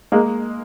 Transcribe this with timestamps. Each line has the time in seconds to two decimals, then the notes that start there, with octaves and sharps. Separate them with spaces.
0.12 G#3 A#3